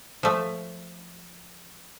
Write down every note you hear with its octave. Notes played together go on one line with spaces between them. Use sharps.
F3 A3